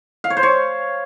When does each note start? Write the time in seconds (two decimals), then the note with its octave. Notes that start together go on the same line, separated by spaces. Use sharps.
0.24 F5
0.30 C#5
0.37 C5
0.43 C#5